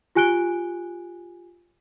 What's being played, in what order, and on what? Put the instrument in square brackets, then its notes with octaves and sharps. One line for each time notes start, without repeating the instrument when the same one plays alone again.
[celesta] F4 G4 G#5 F#6 D7 G7